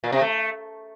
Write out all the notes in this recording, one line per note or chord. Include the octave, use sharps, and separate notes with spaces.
A#2
C3
A3